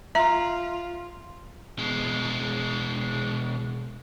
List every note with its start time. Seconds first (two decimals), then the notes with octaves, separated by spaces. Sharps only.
0.15 F4 E5 A#5
1.79 B2 G#3